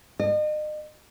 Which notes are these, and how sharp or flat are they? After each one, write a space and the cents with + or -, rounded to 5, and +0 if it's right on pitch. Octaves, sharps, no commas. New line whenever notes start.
D#5 -40